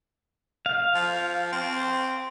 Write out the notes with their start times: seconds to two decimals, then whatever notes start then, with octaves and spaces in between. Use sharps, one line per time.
0.66 F5
0.95 F3
1.53 C4